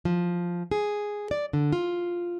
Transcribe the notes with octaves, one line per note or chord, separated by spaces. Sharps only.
F3
G#4
D5
D3
F4